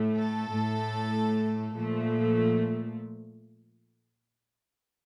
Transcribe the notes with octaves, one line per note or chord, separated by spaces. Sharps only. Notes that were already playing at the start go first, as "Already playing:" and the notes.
Already playing: A2 A3
A4
A2 A3
A#2 F3 A3